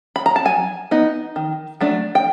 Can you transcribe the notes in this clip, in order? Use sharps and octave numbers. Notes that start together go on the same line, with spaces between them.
B5
A#5
A5
F#3 G#5
B3 D#4
D#3
F#3 A3 D4
G5